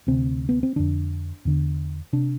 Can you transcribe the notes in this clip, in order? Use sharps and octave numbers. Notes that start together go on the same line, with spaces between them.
D2 C3 C4
B3
C4
F2 D3 D4
E2 D3
C3 D4